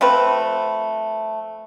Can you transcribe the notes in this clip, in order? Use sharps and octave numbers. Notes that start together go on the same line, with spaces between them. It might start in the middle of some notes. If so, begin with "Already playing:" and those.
F3 A3 C4 B4